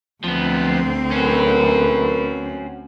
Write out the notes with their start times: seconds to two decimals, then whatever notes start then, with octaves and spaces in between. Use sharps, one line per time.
0.24 D2 F3 B3 C4
1.11 B1 C#4 F#4 A#4 B4